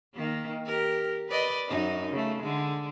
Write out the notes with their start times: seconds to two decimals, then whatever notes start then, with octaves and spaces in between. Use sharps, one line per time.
0.15 D#3 A#3
0.66 G4 A#4
1.29 B4 D5 D#5
1.69 F#2 D#4
2.12 C#3 A3
2.42 D3 G#3